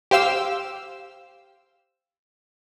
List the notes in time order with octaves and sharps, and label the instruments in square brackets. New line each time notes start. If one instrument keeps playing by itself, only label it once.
[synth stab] G4 C5 F5 E6